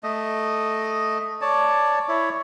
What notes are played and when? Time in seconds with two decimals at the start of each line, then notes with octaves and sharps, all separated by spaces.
0.03 A3 D#5
1.41 C#5 D5 A5
2.08 E4 C#5